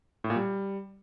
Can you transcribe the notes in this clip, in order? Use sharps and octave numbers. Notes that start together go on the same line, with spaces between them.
A2
A#2
G3